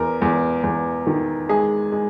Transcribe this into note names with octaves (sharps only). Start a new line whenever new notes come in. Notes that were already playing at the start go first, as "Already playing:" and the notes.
Already playing: E2 A#4
E2
E2
D#3
G#3 G#4
G#3